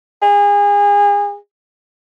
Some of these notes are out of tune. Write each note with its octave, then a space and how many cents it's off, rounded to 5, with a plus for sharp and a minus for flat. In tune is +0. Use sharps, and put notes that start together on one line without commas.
G#4 -30